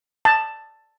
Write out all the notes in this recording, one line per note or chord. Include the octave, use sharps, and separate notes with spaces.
A5